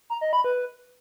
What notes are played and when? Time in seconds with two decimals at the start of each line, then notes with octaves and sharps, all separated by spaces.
0.10 A#5
0.21 D#5
0.33 B5
0.44 B4